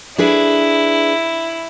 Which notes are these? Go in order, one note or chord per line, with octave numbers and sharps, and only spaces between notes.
D4 E4 G#4 B4